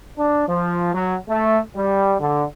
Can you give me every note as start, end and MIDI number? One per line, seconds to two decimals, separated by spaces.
0.18 0.48 62
0.48 0.91 53
0.94 1.16 54
1.30 1.60 57
1.76 2.16 55
2.20 2.46 50